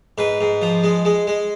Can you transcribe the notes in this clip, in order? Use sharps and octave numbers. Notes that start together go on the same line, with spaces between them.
G#2 B4
G#2
F3
G#3
G#3
G#3